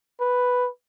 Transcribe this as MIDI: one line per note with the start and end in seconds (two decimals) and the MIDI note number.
0.20 0.68 71